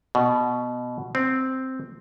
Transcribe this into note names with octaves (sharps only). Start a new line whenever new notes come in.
B2
C4